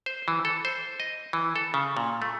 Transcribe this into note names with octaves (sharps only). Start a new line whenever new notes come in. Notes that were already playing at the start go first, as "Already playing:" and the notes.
C5
E3
A4
C5
D#5
E3
A4
C#3
A#2
A3